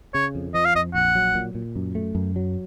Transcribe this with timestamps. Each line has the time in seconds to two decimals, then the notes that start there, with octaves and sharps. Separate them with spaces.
0.14 C#3 C#5
0.35 F2
0.54 F3 D#5
0.65 F5
0.75 F2 D#5
0.94 A#1 F#5
1.15 F#3
1.35 A#2
1.55 A#2
1.76 F#2
1.95 A3
2.15 F#2
2.36 F#3